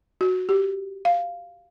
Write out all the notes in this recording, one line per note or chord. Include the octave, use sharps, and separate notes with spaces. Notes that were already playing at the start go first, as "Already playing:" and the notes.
F#4
G4
F5